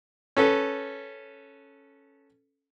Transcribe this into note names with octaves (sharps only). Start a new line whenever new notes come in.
C#4 A4 B4